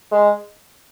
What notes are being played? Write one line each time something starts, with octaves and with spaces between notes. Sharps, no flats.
G#3